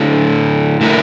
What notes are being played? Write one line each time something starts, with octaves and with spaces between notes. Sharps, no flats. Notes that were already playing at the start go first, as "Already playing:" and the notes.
Already playing: D3 A3 E4 A4
D3 A3 E4 A#4